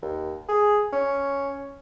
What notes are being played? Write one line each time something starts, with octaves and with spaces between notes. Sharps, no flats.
D#2
G#4
C#4